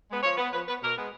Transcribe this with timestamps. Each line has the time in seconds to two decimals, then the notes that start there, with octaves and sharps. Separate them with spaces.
0.09 G#3 B3
0.23 F3 C#5
0.37 B3
0.52 F3 B4
0.68 B3 B4
0.82 B2 A#4
0.97 G#3 B3